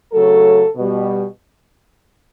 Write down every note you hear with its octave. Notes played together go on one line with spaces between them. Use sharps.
C#3 F#3 A3 A4
B2 G3